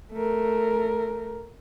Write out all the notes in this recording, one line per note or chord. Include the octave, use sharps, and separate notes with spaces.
A3 A#4